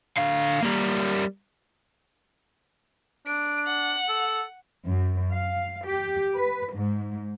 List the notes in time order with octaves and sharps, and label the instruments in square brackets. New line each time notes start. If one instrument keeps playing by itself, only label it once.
[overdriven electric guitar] D3 F5
G3 A#3
[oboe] D4 [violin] D7
[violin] F#5
[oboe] A4
[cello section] F#2
F5
G4
B4
G#2